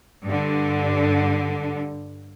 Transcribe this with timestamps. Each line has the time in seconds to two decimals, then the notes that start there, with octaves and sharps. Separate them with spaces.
0.24 G2 D3